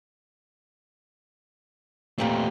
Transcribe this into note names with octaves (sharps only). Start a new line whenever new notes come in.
E2 A#2 A3 C4 G4